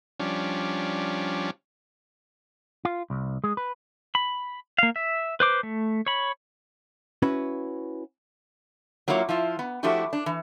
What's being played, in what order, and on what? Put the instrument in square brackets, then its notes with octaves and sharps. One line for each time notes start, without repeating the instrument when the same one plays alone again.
[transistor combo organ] F3 G3 C#4 D4
[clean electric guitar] F4
C2
G#3
B4
[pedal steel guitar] B5
A#3 F5
E5
B4 C5 D6
A3
C#5 B5
[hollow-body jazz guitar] C#4 E4 F#4 B4
[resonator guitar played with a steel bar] F#3 A#3 E4 F4 C#5
F3 E4 F4
B3
F3 A3 D4 E4 F#4 G4
D4
E3